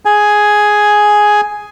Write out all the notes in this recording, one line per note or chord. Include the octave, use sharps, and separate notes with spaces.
G#4 G#5